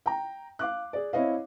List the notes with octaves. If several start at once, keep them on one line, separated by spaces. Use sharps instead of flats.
G5 A#5
F5 D6 F#6
G#4 D5
C4 E4 C#5 D#5 F5